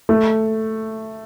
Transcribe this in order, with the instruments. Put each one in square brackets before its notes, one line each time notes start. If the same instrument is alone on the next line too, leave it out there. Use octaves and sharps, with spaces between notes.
[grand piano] A3